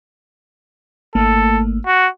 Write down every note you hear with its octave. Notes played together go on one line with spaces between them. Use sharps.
G#1 A3 A#3 A4
F#4